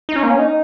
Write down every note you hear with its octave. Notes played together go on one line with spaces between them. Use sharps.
D#4
C#4
A#3
C#4
D#4